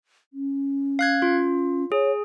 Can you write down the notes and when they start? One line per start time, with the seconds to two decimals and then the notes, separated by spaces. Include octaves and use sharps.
0.33 C#4
0.99 F5 F#6 G#6
1.22 F4
1.92 G#4 C#5